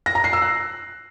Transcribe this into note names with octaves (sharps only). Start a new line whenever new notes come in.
A#6
A#5
C7
E6
F#6